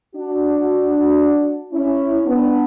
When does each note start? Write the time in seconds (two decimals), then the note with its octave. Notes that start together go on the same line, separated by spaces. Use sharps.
0.15 D4 F#4
1.73 C#4 E4
2.26 B3 D4